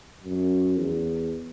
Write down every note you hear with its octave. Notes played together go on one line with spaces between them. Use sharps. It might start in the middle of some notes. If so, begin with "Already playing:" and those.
F#2
E2